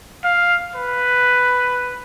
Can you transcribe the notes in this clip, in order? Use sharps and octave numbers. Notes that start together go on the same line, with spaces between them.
F5
B4